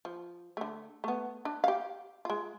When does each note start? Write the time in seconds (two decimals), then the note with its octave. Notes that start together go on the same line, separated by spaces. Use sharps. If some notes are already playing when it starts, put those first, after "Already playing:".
0.05 F3
0.57 D3 A3
1.04 A3 B3
1.45 D4
1.64 G4 F5
2.25 G#3 F4